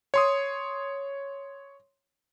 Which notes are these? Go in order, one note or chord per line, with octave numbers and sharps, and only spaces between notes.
C#5 C6 D#6